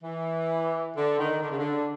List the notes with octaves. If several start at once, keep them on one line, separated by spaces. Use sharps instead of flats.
E3
D3
D#3
D3
C#3
D3